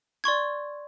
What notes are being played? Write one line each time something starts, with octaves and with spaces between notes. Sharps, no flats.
D5 C6 C#6 G#6